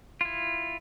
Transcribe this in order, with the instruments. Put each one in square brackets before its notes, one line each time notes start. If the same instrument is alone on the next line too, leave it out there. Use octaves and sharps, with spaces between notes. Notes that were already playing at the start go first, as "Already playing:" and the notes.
[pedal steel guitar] E4 F4